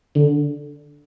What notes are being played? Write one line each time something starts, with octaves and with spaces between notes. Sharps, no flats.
D3